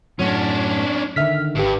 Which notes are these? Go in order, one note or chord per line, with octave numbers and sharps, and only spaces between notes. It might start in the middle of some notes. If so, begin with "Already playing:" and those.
F#2 A2 F#3 C#4 D4
D3 D#3 E5 F6 B6
G#1 G2 G4